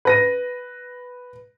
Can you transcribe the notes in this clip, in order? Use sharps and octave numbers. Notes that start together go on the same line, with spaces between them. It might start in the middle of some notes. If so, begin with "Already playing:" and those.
B4 A#6 D#7